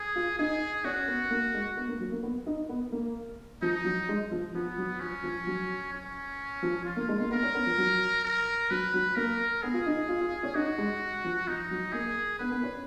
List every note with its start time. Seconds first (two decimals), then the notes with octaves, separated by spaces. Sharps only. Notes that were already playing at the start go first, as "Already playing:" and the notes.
Already playing: G#4
0.16 F4
0.39 D#4 G#4
0.84 C#4 F#4
1.08 B3
1.30 A#3
1.54 G#3
1.77 B3
1.88 A#3
2.00 F#3
2.12 A#3
2.23 B3
2.47 D#4
2.69 B3
2.92 A#3
3.62 F3 D#4
3.85 F#3
4.09 G#3
4.31 F3
4.54 F3 B3
4.78 F#3
5.00 F3 C#4
5.24 F3
5.47 F#3
5.93 C#4
6.62 F3
6.85 F4
6.96 A#3
7.09 G#3
7.20 A#3
7.31 B3 A#4
7.43 C#4
7.55 B3
7.66 F3
7.78 F#3
8.25 A#4
8.71 F#3 B4
8.94 F#3
9.16 A#3 A#4
9.63 B3 G#4
9.74 F4
9.86 D#4
10.09 F4
10.21 F4
10.43 C#4
10.55 D#4 F#4
10.78 G#3
11.24 F3
11.48 F3 D#4
11.71 F#3
11.93 A#3 G#4
12.39 B3 B4
12.51 B3
12.63 C#4